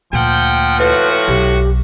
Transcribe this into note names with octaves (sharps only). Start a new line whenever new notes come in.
D2 A#2 F3 F#5 G5
A2 F#4 B4
B1 G4